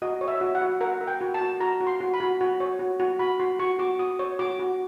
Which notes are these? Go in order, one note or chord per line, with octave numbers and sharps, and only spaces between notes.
F#4 D#5
C#5
E5
F#4
F#5
F#4
A#4 F#5
A#4
G5
F#4
A5
F#4
F#4 A#5
F#4
C6
F#4
B5
F#4
F#4
C#5
F#4
F#4
F#4 B5
F#4 C6
F#4 C#6
F#4 D6
F#4 D#6
C#5
F#4 D6
F#4